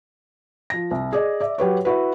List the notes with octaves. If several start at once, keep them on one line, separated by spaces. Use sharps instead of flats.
F3 A#6
C2
G#4 D5 D#5
D5 E5
F#3 G4 B4 C#5
E4 F#4 B4